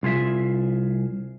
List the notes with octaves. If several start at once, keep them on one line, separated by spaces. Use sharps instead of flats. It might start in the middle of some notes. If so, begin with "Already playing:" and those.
C2 F4 G#4 E5